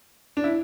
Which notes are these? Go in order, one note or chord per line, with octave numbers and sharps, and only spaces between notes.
D4
E4